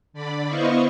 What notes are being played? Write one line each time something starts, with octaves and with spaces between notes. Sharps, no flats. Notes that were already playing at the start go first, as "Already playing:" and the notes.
D3 D5 B5
B3 E4 C5 D#5 F5 C#6